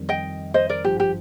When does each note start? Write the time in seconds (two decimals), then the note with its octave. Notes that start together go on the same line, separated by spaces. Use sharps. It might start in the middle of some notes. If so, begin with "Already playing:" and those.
Already playing: F2 D#3 G3
0.09 D#5 G5
0.54 C5 D#5
0.69 A#4 D5
0.84 G#1 G2 F3 G4
1.00 G4